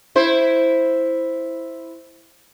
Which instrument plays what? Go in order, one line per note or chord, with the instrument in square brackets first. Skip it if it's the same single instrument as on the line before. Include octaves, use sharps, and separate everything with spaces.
[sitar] E4 C5